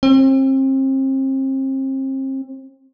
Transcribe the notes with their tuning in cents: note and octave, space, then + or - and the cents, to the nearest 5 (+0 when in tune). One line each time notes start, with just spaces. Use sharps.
C4 +35